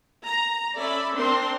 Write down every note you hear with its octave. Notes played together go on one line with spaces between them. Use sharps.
A#5
C#4 A4 D5 E5 B5
C4 D4 A#4 C6